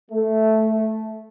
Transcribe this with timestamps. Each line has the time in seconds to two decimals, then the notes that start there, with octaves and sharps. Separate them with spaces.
0.11 A3